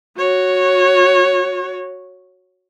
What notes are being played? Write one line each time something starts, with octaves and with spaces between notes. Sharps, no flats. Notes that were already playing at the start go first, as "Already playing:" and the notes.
F#4 C#5